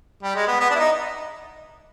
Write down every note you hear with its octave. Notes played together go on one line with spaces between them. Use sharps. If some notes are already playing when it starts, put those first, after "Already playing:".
G3
G#3
B3
B3
D4
E4
D#4